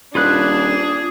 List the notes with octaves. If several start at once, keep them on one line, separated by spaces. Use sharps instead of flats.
D#1 D4 F4 G#4 B5 F#6